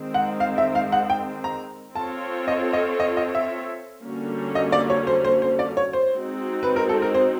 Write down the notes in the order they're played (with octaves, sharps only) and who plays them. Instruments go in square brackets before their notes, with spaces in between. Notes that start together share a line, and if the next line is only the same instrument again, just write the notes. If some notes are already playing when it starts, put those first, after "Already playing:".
Already playing: [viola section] D#3 G#3 C4
[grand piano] F#5
F5
E5
F5
F#5
G5
A#5
[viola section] C4 F4 A4 C#5 [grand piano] A5
[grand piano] D#5
D#5
D#5
D#5
E5
[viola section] D3 G3 A#3 C#4 F#4
[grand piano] D#5
D5
C#5
C5
C5
C5
D5
C#5
C5
[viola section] G#3 C4 D#4 F#4
[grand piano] B4
A#4
A4
A#4
C5